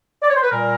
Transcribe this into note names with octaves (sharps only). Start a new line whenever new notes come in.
D5
C#5
C5
B4
A#2 G3 A#4